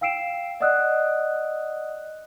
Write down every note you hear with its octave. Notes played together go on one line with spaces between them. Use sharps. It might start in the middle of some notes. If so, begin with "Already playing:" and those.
F5 G5 E6 C7 D7 E7
D5 D#5 F#5 D#6 E6 F#6